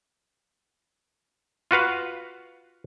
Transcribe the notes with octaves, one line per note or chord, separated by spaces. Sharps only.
F4 F#4 B4 F5